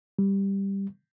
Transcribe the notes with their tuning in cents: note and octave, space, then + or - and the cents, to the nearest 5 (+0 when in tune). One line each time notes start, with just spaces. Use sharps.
G3 +5